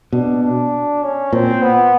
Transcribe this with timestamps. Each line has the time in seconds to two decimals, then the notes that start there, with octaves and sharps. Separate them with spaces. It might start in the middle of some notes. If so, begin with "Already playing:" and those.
0.13 B2 D4
0.43 D4
1.03 C#4
1.33 A#2 C4
1.62 B3